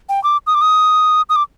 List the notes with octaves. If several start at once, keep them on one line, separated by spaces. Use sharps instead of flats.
G5
D6
D#6
D6
D#6
D#6
D6